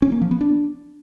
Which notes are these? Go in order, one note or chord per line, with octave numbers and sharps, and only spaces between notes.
C#4
A#3
F3
B3
D4